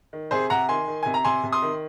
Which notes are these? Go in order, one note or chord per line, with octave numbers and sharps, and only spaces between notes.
D#3
C3 G#4 C5
C3 F#5 A#5
D#3 G#5 C6
D#3
C3 G#5
A#5
C3 G#5 C6
C3
C6 D#6
D#3